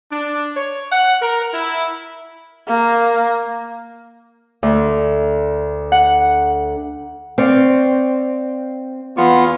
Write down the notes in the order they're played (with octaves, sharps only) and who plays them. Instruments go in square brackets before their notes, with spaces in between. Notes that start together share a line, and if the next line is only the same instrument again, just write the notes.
[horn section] D4
C#5
F#5
A#4
E4
[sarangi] A#3
[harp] D2
F#5
[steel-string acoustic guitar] C4 [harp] D5 F5 C#6
[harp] E2 C#6 [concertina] B3 F4